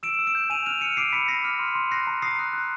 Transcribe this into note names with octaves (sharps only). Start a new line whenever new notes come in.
E6 D7 E7
E6
D7 E7
G6
G#5 D#7 F7
F6 D#7 F7
F6 C#7 D#7
D6 C7 D7
B5 B6 C#7
D6 A#6 C7
F6
C6
C6
F#6 A#6 C7
A#5
D#6 A#6 C7
F#6
F#6